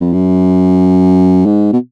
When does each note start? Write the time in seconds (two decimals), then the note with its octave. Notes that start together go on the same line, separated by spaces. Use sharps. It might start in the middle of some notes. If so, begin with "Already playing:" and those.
0.01 F2
0.13 F#2
1.46 G#2
1.73 B2